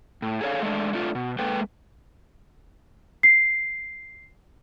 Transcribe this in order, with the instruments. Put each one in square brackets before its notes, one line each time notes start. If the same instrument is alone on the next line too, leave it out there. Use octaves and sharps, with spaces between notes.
[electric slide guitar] A2
G#4 A4 C#5 F5
G#3 A3 D4
A3 D4 F4
B2
G#3 A#3 A4 B4 G5
[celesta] C7